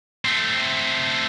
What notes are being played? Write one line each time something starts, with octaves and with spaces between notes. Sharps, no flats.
A3 C4